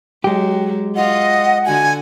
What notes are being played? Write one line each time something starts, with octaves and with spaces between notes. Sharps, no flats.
F#3 G#3 G4
F4 D#5 F#5
D3 F#4 G#5